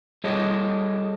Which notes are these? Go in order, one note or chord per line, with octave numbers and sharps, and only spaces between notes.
G3 G#4 A4 C#5 D#5